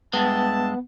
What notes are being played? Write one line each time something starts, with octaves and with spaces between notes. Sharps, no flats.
G2 G#3 B3 E5 A5